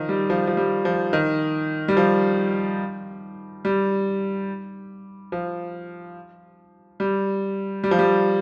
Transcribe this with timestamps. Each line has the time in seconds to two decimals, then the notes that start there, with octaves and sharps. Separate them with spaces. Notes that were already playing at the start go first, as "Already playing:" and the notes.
Already playing: D#3 F3
0.09 G3
0.30 F3
0.47 F3
0.57 G3
0.85 F3
1.13 D#3
1.88 G3
1.97 F3
3.65 G3
5.32 F3
7.00 G3
7.84 G3
7.91 F3
7.99 G3